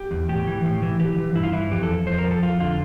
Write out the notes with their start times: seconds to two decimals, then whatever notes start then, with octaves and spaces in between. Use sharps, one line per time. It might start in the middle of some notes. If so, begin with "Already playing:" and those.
Already playing: G4
0.11 E2
0.29 A2 G4
0.47 E3
0.64 A2
0.82 E3
1.00 E3 G4
1.18 E3
1.35 G2 E4
1.43 F4
1.52 E3 E4
1.71 F2 G4
1.83 A4
1.88 F2
2.07 F2 C5
2.19 A#4
2.24 F3
2.31 A4
2.42 F2 F4
2.60 D3 F4